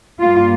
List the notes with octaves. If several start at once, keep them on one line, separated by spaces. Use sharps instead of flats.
G2 G3 A#3 F4